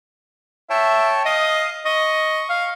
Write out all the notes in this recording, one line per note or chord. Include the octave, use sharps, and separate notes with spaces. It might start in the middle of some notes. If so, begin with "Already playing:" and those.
C#5 E5 G5 A5
D#5 F5 D#6
D#5 C#6
F5